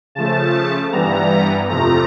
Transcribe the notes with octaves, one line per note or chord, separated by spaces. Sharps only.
C#3 F3 A3 A5
G2 E3 G3 B3 A#5
F2 C3 F3 A3 A#5